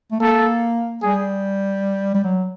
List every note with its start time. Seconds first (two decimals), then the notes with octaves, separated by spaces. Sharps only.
0.12 A3
0.20 A#3 A4
1.02 G3 G#4
2.14 G3
2.24 F#3